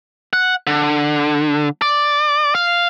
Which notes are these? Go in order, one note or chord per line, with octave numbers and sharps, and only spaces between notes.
F#5
D3
D5
F5